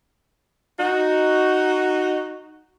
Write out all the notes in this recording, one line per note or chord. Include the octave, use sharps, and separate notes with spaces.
D#4 F#4